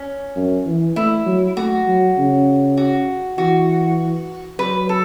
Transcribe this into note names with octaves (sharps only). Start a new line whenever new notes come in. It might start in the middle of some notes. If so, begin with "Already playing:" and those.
Already playing: C#4
F#2
E3
A3 E4
F#3
A3 F#4
F#3
C#3
F#4
E3 F#4
F#3 B4
A4